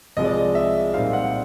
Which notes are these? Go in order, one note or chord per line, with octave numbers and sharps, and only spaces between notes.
C2 C3 F3 G#3 D#5
D5
D#5
E5
A#2 G3 C4 D#4 F5
F#5